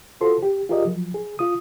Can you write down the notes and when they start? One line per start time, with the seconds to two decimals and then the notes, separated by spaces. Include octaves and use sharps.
0.21 F4 F#4 A4 C5 C6
0.43 G4
0.69 F4 G4 G#4 A#4 D5 D#5
0.86 F3 F#3
1.14 G#4
1.39 F4 D#6